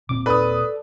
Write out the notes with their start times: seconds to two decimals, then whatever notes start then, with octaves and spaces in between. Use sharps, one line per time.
0.09 D#1 A#2 C4 D6
0.26 A4 B4 D5 D#6